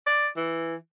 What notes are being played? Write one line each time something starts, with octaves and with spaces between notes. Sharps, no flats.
D5
E3